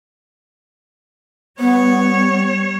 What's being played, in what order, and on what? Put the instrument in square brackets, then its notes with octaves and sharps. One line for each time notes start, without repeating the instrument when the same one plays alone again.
[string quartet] G3 C#5 [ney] B3